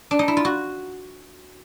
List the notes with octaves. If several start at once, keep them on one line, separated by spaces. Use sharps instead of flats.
D4
D#4
E4
F4
F#4